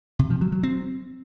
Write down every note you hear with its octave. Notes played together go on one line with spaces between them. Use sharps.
C3
F3
F#3
F#3
C4